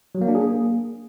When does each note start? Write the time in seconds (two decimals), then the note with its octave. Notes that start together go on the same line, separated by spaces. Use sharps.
0.15 F#3
0.21 A#3
0.28 D4
0.35 G#4
0.42 A#3